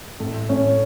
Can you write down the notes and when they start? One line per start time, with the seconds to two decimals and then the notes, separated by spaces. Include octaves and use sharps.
0.20 A2 A4
0.49 A2 C#4 C#5